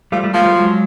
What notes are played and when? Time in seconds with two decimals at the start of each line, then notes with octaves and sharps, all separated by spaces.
0.12 F3 G3 A3
0.23 G3 A3
0.34 F3 G#3 A#3
0.45 G3 A3
0.55 F#3 G#3